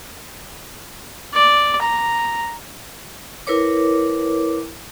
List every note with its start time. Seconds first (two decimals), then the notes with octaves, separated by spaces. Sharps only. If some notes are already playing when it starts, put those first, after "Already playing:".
1.34 D5
1.82 A#5
3.47 E4 A#4 B4 C#5 D6